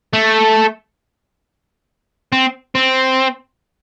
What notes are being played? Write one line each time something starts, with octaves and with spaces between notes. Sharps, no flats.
A3
C4
C4